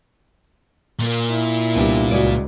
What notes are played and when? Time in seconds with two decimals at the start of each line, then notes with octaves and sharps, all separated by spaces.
0.99 A#2 A#3
1.31 E4
1.76 C2 B3 D4 G4
2.11 C#2 F#4 G#4 D5